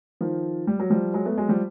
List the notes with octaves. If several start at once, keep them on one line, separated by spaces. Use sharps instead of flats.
D#3 F3
G3
F#3
F3 G3
F#3 G#3
A3 B3
F#3 G#3
F3 G3